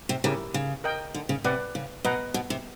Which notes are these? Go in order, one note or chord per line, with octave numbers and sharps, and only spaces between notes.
C3
C#3 E4 G4 A#4
C#3
A#4 D#5 G5
D3
C#3
C3 B4 D5 F#5
C#3
B2 B4 D#5 F#5 A#5
B2
C3